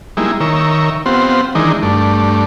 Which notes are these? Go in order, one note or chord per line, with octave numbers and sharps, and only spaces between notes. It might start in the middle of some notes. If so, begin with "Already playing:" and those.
G3 G#3 A#3 D#4 E4
D#3 A#4 C#5 E5
B3 C4 F4 G4 C5 F#5
D#3 E3 G#3 D4 D#4 A#4
G2 A3 D4